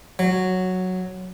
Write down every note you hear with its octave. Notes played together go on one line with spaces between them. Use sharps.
F#3